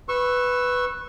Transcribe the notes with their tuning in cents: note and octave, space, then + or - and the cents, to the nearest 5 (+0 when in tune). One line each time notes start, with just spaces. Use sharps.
B4 +5 C#6 -20 E6 +0